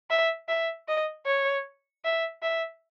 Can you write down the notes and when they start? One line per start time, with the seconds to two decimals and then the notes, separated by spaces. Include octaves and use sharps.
0.10 E5
0.48 E5
0.88 D#5
1.26 C#5
2.04 E5
2.42 E5